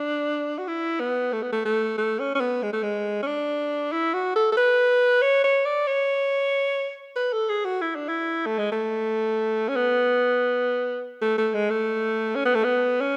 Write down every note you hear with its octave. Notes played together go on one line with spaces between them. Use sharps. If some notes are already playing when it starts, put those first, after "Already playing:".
Already playing: D4
F#4
E4
B3
A3
B3
A3
A3
A3
C#4
C#4
B3
G#3
A3
G#3
C#4
D4
E4
F#4
A4
A4
B4
C#5
C#5
D5
C#5
B4
A4
G#4
F#4
E4
D4
E4
A3
G#3
A3
C#4
B3
A3
A3
G#3
A3
C#4
B3
A3
B3
C#4